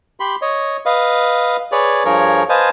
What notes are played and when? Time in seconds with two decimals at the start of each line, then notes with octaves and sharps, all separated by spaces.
0.20 G4 B5 C6
0.42 C#5 D#5
0.86 B4 D#5 F5
1.72 G#4 B4 C#5 D5
2.05 G2 F3 G#4 A#4 C#5
2.49 B4 C5 D#5 F5 G#5 A5